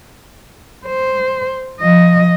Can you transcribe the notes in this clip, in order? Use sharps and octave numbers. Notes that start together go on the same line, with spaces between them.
C5
F3 D#5